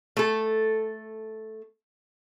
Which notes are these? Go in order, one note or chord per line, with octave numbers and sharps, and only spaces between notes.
A3 A4